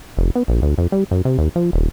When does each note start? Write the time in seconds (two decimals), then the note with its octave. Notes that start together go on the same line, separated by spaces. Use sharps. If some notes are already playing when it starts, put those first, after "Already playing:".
0.17 F1
0.36 B3
0.48 A#1
0.62 D2
0.78 F2
0.92 G3
1.11 F#2
1.25 C3
1.38 D#2
1.56 F3
1.73 D#1